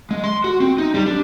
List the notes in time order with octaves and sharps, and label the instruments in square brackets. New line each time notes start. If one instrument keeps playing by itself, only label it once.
[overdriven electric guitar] G#3
C6
F#4
C4
D#4
G3
D4